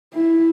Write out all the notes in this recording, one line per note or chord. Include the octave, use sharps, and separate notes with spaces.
E4